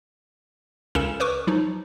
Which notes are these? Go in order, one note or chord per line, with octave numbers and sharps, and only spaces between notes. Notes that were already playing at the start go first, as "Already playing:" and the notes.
C#2 C#3 C#4 A4 A#4 E7
A#4 B4 C#6 D6
F3 F#3 D#4